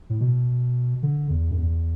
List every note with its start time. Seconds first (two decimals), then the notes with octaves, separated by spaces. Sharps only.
0.10 A2
0.21 B2
1.03 D3
1.30 E2
1.51 F#2
1.58 E2